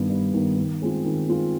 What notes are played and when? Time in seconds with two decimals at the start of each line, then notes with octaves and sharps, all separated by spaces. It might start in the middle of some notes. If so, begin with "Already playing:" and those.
Already playing: G2 D#3 B3
0.10 G2
0.33 D#3 B3
0.57 D#3
0.82 G#3 C4 F4
1.05 D#3
1.29 G#3 C4 F4